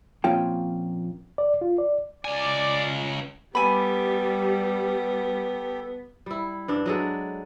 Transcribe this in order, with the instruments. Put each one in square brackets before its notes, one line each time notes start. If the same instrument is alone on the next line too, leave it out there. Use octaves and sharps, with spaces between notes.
[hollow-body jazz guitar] A#2 F3 C4 C#4 F4 G5
[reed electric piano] D5
F4
D5
[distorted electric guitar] C#2 G#5 [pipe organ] D5
[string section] G3 [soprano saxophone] B3 [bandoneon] G4 A4 [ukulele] G#5 B5
[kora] G3 E4
G2 D4
F#3 G#3 A4